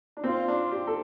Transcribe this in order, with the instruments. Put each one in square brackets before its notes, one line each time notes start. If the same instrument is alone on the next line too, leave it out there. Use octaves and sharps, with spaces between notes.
[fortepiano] D4
[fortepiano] C4 [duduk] F4
[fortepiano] D4
G4
A4